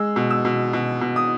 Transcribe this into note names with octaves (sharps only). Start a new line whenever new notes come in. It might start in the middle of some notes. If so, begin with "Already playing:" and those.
Already playing: G#3 E6
B2
E6
B2
B2
B2
D#6